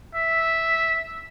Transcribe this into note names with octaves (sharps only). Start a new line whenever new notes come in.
E5